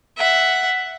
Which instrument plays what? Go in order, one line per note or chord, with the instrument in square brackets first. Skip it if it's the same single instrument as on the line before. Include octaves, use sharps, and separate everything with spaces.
[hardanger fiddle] E5 F#5